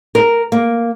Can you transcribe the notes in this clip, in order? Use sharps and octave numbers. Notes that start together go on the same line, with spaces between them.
A#4
A#3